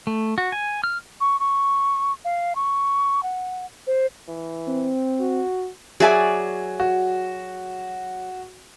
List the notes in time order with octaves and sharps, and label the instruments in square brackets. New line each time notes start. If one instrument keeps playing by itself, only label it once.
[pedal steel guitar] A3
F#4
G#5
F6
[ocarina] C#6
C#6
F5
C#6
F#5
C5
[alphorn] E3
[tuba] C4
[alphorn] F#4
[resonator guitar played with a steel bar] F#3 E5 G#5 [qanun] G#4 D5
[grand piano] F#4